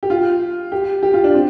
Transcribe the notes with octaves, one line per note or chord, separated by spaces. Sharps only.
G4
F4
G4
G4
F4
D4
C4